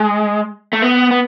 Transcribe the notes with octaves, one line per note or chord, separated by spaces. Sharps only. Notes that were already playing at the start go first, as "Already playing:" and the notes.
Already playing: G#3
A3
B3
B3